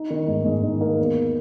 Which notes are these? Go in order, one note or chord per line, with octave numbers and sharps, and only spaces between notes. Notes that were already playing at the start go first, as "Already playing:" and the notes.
Already playing: D#4
D#3
G#2
G#2
D#3
A#3
E2